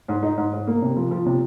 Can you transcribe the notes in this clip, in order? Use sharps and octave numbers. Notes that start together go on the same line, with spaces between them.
G#2
D#4
G#2
G#2
A#3
C3
F3
F3
C3